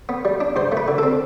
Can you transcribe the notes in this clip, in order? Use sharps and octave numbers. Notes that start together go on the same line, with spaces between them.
B3
G3
D4
G2 C5
A3
B4
D3
C4 A4